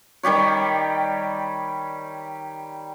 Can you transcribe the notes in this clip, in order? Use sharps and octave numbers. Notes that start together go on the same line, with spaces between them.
D#3 G3 G4 C#5